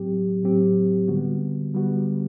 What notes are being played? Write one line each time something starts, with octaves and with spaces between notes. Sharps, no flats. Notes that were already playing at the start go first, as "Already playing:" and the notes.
Already playing: A2 F#3 C4 G4
A2 F#3 C4 G4
D3 G3 B3 F#4
D3 G3 B3 F#4